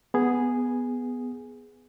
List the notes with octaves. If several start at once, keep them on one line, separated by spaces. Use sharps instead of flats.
B3 G#4